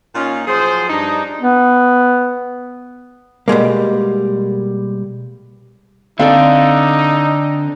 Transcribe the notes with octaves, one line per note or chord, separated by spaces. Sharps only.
A#2 C#4 D#4 F4
F3 F#3 G#4 C5
G2 D4 D#4
B3
B2 G3 G#3 A#3
D3 C4 D#4 A4 D5 F5